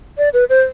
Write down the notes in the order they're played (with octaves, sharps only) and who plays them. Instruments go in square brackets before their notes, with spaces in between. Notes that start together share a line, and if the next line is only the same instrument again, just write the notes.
[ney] D5
B4
C5